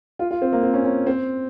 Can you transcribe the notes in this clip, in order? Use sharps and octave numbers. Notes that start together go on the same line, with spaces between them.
F4
F4
C4
A#3
C4
C#4
C#4
C4